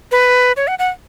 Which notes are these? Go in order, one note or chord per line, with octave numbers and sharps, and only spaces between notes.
B4
C#5
F#5
F#5